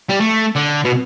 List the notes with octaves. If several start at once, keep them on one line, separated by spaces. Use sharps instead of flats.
G3
A3
D3
B2